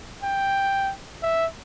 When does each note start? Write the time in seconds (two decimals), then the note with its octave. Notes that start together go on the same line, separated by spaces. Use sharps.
0.23 G5
1.23 E5